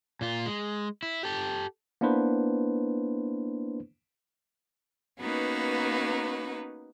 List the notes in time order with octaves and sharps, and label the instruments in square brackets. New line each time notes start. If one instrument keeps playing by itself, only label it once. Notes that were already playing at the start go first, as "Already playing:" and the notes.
[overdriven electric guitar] A#2 F4
G#3
E4
G4 A4
[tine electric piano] A#3 B3 D4 E4 B4 C5
[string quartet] A#3 B3 C#4 D#4 F#4 B4